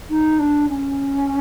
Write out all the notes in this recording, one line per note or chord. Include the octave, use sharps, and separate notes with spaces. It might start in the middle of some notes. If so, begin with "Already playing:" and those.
D#4
D4
C#4